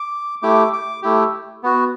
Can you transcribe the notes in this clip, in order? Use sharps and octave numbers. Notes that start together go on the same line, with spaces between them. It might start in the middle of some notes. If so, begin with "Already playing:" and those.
Already playing: D6
A3 E4 G4 D6
D6
A3 E4 G4
B3 F#4